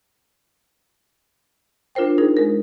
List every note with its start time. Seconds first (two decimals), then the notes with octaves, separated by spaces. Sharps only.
1.95 D4 F4 A#4 C5 G5
2.18 D#4 G#4 A#4 C5
2.37 G#3 A#4